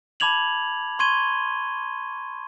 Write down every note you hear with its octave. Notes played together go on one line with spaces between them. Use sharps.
A5 B5 D6 G#6 F7 F#7
C6 C#6 G#6 D#7 G7